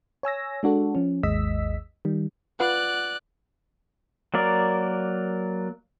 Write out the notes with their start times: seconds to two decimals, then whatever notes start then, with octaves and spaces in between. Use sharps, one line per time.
0.23 C#5 G#5 E6 A#6
0.63 G#3 D4 F#4 A4
0.95 F3 C#4
1.23 G#1 D#2 G#3 D#5 E6 B6
2.05 D#3 G3
2.60 F4 B4 D5 F#5 F#6
4.34 F#3 A#3 A#4 D5